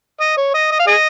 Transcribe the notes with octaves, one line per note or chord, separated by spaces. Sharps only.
D#5
C#5
D#5
D#5
F5
G#4 D#5